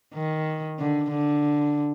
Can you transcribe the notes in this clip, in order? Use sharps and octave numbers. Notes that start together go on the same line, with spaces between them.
D#3
D3
D3